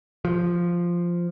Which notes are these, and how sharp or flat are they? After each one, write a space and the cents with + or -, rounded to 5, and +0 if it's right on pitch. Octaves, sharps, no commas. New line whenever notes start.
F3 -5